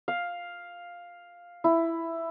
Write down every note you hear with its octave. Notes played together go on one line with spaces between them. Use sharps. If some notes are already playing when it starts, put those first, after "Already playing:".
F5
E4